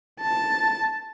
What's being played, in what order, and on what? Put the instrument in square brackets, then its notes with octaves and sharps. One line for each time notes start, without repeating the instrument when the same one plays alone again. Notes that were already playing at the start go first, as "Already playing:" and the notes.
[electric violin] A5